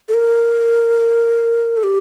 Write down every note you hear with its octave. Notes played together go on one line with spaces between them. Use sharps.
A4
A#4
A4
G4